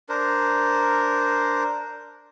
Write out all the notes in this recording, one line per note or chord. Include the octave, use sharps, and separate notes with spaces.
D4 A#4 C5